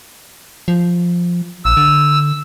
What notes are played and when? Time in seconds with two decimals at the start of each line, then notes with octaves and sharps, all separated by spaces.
0.68 F3
1.65 A#1 E6
1.77 D3